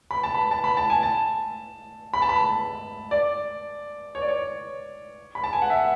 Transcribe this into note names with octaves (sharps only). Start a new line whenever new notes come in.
B5
A5
B5
A5
B5
A5
G#5
A5
B5
A5
B5
D5
C#5
D5
C#5
B5
A5
G#5
F#5
E5